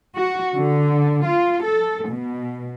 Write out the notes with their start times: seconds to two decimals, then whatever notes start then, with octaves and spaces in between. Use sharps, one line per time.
0.16 F#4
0.55 D3
1.25 F4
1.64 A4
2.07 B2